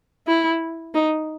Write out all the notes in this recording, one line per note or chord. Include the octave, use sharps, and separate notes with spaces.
E4
D#4